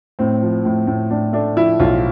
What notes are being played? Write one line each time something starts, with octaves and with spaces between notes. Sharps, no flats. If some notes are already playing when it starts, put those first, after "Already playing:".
A2 C4
F3
A2
A2
A2 D4
A3 D4
F3 E4
B1 F4